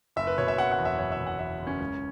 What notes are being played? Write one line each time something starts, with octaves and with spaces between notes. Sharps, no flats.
F#1 E5
B4
B2 C#5
E5
F#1 F#5
F#5
E2
E5
F#1 C#5
E5
B2
F#5
E2 E5
F#1
C#4
C#2